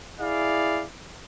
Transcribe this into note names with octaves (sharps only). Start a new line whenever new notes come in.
E4 G#4 D5 F5